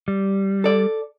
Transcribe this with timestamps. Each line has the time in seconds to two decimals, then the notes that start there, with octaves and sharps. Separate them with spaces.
0.08 G3
0.64 A4 D5